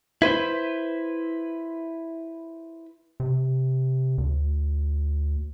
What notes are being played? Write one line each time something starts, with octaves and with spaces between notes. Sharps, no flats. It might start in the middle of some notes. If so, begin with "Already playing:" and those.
E4 B4 C5
C3
D2